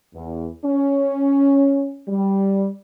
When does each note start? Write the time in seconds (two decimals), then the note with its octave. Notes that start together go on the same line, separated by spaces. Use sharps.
0.14 E2
0.65 C#4
2.08 G3